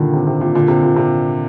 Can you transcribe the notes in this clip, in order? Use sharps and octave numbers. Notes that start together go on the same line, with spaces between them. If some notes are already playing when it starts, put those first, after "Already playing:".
Already playing: A#2 D3 D#3 G3
C3
C3
A#2
A#2 D3
C3
A#2
C3